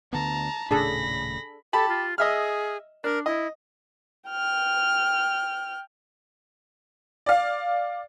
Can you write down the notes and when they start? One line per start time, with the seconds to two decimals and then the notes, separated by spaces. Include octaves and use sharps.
0.13 D2 D3 B3 A5 A#5
0.71 D#1 A2 C#3 D4 G#4 A4 B5 A#6
1.73 G4 A4 A5 B5
1.89 F4
2.18 G#4 D#5 E5 F6
3.04 D4 A#4
3.26 E4 D#5
4.30 G5 F6
7.26 D5 F5